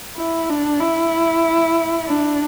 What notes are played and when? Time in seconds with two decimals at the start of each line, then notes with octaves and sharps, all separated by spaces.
0.17 E4
0.49 D4
0.80 E4
2.07 D4